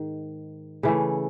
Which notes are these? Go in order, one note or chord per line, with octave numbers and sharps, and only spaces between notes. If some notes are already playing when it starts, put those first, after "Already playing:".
Already playing: G#2 D#3
C#3 E3 A3